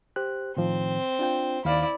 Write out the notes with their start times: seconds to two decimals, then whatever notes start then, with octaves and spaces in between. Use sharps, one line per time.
0.16 G4 C5 F#6
0.57 A2 D#3 F3 C4
1.19 D4 F4 G5
1.65 D#2 D#3 E4 D5 F5